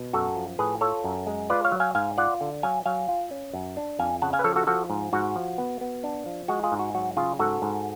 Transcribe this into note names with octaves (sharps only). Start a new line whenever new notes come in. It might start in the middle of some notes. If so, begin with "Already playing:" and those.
Already playing: B2
F#2 F#4 A4
F3
A2 G#4 B4
F4 A4 C#5
F#2
G#3
F4 B4 D5
C#5 F5
F#3
F5 G#5
G#2 F5 G#5
F4 D5 F#5
D3
F#3 F5 G#5
F#3 F5 G#5
F4
C#4
F#2
D4
F2 F5 G#5
C#3 F#5 A5
F5 G#5
B4
F3 A4 C#5
F#4 A4
F3 F#4 A4
G#2
G#2 F#4
F3
B3
B3
D4
F3
G#3 F#4
F4 G#4
G#2
F#4
F#3 F#4
C#3 F4 G#4
G#2 F#4 A4
G#2